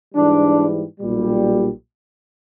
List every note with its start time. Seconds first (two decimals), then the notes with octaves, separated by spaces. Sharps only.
0.14 G#2 E3 G3 D4
1.00 B1 A#2 G3